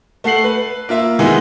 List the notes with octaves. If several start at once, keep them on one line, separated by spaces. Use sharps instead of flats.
A3 F#5 C7 F#7
B4
A#3 F4 E5
D#3 E3 G#3 B3